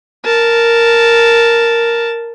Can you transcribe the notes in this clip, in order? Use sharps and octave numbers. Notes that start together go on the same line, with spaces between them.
A#4 A5